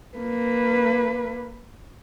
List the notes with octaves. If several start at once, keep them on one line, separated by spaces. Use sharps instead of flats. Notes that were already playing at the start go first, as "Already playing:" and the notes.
A#3 B4